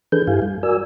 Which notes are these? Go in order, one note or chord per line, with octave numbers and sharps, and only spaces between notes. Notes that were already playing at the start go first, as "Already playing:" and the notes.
E3 D4 G#4 A4 B4 G6
G2 E4 G4 F5 G#5
G3
F#4 A#4 D5 G#5 E6